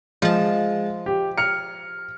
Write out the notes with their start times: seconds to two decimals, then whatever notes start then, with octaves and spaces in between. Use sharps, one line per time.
0.22 F3 G#3 A5
1.06 G4
1.38 F6 C#7